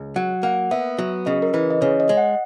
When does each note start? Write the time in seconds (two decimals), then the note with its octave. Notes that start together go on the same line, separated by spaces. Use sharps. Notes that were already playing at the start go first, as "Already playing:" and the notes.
Already playing: C#2
0.16 F#3 F#5
0.43 A#3 F#5
0.71 B3 E5
0.98 F#3
1.26 C#3 D#5
1.42 A#4
1.54 E3 B4
1.71 D#5
1.81 C#3 C#5
2.00 D#5
2.09 G#3
2.17 F#5